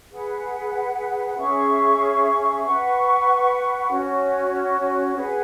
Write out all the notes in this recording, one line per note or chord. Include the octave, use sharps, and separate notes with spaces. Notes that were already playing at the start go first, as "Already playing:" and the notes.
G#4 B4 F#5
C#4 G#4 E5 C#6
B4 F#5 C#6
C#4 F#4 C#5
G#4 B4 F#5